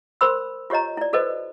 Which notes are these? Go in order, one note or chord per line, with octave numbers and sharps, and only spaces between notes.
A#4 C5 B5 C6 E6
F4 G4 C#5 D#5 A#5
E4 D5
F#4 A4 B4 C5 D#5